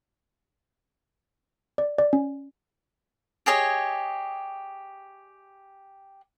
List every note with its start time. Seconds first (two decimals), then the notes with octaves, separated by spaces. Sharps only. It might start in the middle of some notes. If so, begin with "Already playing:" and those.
1.78 D5
1.98 D5
2.13 C#4
3.46 G4 G#4 C#5 D#5